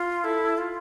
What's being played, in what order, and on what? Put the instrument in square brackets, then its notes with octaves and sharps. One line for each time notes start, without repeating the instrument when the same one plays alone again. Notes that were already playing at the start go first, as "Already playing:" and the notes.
Already playing: [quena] F4
[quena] E4 [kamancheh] A4
[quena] F4